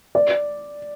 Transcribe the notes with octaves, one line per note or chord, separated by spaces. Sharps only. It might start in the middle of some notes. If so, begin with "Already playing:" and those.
D5